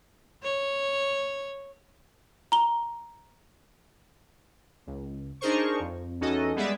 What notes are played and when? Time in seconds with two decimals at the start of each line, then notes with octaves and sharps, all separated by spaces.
0.43 C#5
2.52 A#5 G7
4.87 C#2
5.41 D4 D#4 G#4 A#4 C5 C#6
5.80 F2
6.21 E2 C#4 D#4 F#4 A4 D#5
6.55 G3 G#3 B3 G#4 D5 E5